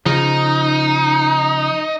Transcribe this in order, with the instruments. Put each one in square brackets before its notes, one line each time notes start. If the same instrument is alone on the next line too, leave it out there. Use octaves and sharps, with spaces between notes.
[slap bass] C#3 F3 [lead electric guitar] D#4